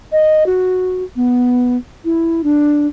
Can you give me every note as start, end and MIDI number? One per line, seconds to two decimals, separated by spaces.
0.12 0.46 75
0.46 1.04 66
1.16 1.76 59
2.05 2.41 64
2.44 2.87 62